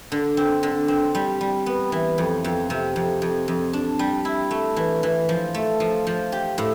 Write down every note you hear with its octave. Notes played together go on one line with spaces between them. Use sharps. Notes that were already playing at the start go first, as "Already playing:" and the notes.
D3
C4
D3
C4
G3
G3
B3
E3
F2
F2
C3
F2
F2
F2
D4
G3
E4
A3
E3
E3
F3
A3
F3
F3
G4
A2